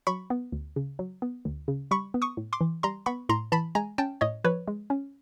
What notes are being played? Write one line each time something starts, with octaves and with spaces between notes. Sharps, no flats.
F#3 B5 C#6
B3
D2
C#3
F#3
B3
D2
C#3
G3 B5 C#6
B3
C#6 D#6
A2
C6 D6
E3
G3 A#5 C6
B3 B5 C#6
A2 A#5 C6
E3 A5 B5
G#3 G#5 A#5
C#4 G5 A5
A2 C#5 D#5
F3 B4 C#5
G#3
C#4